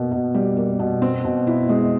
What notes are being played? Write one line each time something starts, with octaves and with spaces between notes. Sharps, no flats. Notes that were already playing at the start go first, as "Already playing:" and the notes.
Already playing: B2 A#3
B2
G3
A#3
B2
C4
B2
E4
G#3